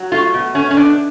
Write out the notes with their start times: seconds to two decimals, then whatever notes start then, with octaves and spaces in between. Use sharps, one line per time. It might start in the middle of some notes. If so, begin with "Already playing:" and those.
Already playing: F#3
0.12 A3 F4
0.34 B2
0.55 A3 C#4
0.71 C#4
0.76 B2 D4